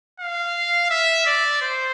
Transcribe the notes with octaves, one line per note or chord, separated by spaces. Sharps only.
F5
E5
D5
C5